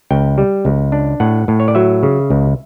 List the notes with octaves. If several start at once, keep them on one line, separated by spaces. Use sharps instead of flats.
C#2 G5
G3
C#2
D4
A2 F#5
A2
C#5
D5
F#3 E5
C#3
C#2